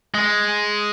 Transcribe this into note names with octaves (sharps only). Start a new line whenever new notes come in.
G#3